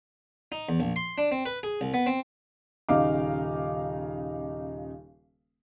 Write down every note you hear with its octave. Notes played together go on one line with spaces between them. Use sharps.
D#4
E2
A#1
C6
D4
C4
B4
G#4
C2
B3
C4
D#1 C#3 D#4 F5 D6